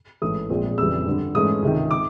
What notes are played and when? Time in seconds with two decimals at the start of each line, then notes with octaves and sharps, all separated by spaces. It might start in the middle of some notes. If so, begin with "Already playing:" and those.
0.22 A1 G#2 E3 A3 D#6
0.50 A#1 A#2 F3 G#3 C4
0.78 F2 C#3 E3 G3 E6
1.06 G2 D3 G3
1.35 G#2 E3 A3 C#4 D#6
1.62 C#2 C3 D#3
1.91 D6